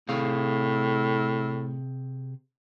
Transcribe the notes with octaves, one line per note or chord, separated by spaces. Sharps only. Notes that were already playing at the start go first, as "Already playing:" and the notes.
A2 C3 G#4 F5